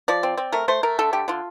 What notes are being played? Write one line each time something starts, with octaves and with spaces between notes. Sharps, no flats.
F3 D5
C4
C4
A3 A#4
A3 C5
A3 A#4
D3 A4
D3 G4
D3 F4